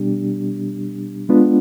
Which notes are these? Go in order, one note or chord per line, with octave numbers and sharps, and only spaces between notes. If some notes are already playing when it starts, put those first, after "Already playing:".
Already playing: B2 G3 B3 D4 G4
G#3 B3 D4 F4